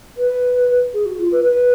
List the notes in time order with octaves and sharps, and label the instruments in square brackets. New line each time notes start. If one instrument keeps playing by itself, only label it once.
[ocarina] B4
G#4
F#4
F4
B4
B4